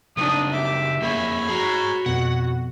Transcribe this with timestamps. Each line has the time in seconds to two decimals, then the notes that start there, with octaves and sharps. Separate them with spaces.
0.17 C#3 F#3 D4 D#4 D#6
0.52 G4 E5 D6
1.01 F2 A#3 G#4 C#5 B5
1.48 F#4 G#4 A5 A#5
2.06 F2 B2 F#5